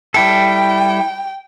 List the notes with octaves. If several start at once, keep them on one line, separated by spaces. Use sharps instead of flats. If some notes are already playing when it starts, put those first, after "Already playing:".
G3 E4 A4 G5